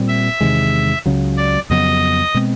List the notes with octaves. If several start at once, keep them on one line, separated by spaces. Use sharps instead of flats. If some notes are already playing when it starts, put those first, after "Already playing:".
Already playing: A#2 G3 C4
E5
E2 C3 D#3 G#3
C#2 C#3 F#3
D5
F2 C#3 F#3 B3 D#5
B2 G#3 C4